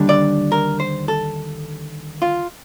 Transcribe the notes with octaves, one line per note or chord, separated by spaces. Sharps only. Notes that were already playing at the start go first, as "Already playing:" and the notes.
Already playing: D#2 D3 G3 D4
D5
A#4
C5
A4
F4